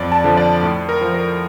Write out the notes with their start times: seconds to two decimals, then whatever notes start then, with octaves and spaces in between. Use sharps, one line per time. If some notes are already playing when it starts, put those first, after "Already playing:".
Already playing: F2 D5
0.12 A5
0.24 D3 F3
0.37 D5
0.63 A2
0.89 A#4
1.01 F3
1.14 A#4